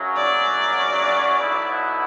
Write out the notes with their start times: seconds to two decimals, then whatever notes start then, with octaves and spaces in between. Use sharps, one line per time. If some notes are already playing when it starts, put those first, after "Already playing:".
Already playing: F#2 C#3 F#3
0.17 D5
1.39 B1 B2 F#3 B3 E4